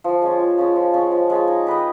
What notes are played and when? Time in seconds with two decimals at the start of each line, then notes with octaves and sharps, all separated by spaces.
0.04 F3
0.22 G#3 C#4 F4
0.40 F3
0.57 G#3 C#4 F4
0.76 F3
0.93 G#3 C#4 F4
1.11 F3
1.30 G#3 C#4 F4
1.48 D#4
1.67 G4 B4 D#5